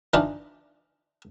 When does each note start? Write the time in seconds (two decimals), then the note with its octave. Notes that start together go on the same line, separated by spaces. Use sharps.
0.14 E3 D4 D#4 F4